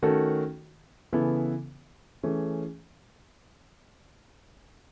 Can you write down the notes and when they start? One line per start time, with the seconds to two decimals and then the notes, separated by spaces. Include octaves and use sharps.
0.03 D#3 A3 C#4 F#4 A4
1.13 C#3 E3 B3 E4 A4
2.23 E3 A3 C#4 G#4